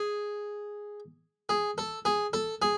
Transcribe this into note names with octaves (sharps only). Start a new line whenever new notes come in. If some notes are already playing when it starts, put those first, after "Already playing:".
Already playing: G#4
G#4
A4
G#4
A4
G#4